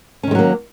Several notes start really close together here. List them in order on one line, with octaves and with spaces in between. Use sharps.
C#4 D#3 G#3 F#3 A#3